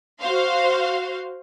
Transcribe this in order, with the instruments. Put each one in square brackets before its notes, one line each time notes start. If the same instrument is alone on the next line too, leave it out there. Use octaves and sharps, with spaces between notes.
[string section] F#4 C5 F5 C6